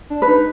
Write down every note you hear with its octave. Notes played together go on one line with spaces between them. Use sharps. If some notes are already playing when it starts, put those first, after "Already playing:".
D4
B4
D#4